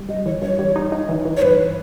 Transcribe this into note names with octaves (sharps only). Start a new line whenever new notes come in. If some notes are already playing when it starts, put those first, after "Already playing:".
Already playing: G3
G2 D#5
E3 C#5
G2 C#5
G3
D#4
D#4
E3
E3
C#5
G2 B4